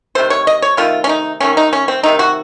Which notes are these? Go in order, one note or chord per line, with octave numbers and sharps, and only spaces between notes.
C3 D#3 A3 C5
C#5
D#5
C#5
C3 D#3 A3 F4
C#4
D#4
C3 D#3 A3 C#4
D#4
C#4
C4
C3 D#3 A3 D#4
F#4